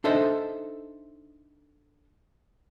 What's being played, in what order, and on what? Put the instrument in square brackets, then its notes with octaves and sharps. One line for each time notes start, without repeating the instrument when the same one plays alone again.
[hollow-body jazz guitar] D4 D#4 A4 C5 D#5 E5